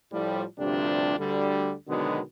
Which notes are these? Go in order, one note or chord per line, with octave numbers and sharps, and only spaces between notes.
A2 F3 G3
D2 G2 C3 F3 D4 G4
D2 D3 G3
B2 D3 D#3 F#3 G#3 B3